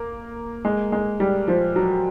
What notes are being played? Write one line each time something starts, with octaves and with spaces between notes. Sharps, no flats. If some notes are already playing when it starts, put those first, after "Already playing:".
Already playing: A#3
G#3
G#3
G3
F3
F#3